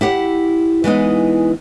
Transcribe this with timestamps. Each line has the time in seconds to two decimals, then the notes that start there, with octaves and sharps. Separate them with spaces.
0.01 E4 G4 F#5
0.84 E3 G#3 B3 D#4